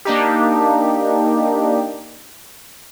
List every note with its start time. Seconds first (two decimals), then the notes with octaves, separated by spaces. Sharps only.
0.05 A#3 D4 D#4 G4